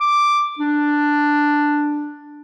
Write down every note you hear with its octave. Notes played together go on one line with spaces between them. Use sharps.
D6
D4